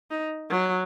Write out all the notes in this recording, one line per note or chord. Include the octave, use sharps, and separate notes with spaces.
D#4
F#3